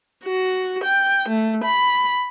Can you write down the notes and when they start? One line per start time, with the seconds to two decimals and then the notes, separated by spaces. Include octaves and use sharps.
0.24 F#4
0.84 G5
1.29 A3
1.64 B5